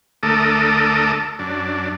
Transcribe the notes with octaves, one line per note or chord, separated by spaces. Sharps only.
D2 A3 A4 A#4 D6 D#6
F#2 D4